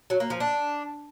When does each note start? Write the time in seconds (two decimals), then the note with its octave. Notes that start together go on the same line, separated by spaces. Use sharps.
0.10 F#3
0.20 A#3
0.30 F3
0.40 D4